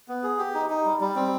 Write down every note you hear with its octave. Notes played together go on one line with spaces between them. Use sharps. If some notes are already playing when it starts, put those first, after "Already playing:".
B3
G#4
G4
D#4
D#4
G3
G3
C4